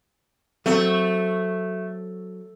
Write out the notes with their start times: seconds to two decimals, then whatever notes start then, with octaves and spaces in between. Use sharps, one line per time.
0.66 F#3 A3 C4